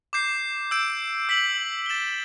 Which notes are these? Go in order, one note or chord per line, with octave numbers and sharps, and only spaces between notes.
D6 G6 C7
E6 G6 D7
E6 B6 F#7
A6 E7 G7